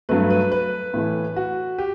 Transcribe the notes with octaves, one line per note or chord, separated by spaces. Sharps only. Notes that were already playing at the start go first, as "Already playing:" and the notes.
G2 F#3 A3 B4
B4
B4
A2 E3 A3
F#4
G4